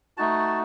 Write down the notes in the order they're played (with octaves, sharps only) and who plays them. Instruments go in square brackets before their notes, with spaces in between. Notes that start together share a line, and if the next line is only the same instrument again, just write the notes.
[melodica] A3 D#4 F#4 A5